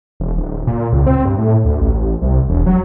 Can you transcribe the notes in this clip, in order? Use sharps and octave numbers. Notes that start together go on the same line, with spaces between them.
E1
D1
A#2
C#2
C4
G2
A2
D2
A1
C2
E1
F#3